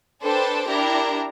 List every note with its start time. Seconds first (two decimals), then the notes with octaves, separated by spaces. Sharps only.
0.21 D4 A4 B4 C5 G5 A5
0.67 D4 E4 G4 A#4 A#5